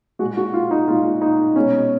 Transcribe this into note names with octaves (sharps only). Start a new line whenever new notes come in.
A#2 G#3 F#4
F#4
F4
D#4
A#2 G#3 F4
D#4
B2 G#3 C#4